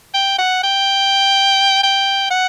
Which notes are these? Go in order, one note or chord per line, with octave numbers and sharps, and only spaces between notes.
G5
F#5
G5
G5
F#5